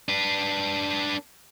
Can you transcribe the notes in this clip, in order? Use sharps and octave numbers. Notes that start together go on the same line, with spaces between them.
D4 B4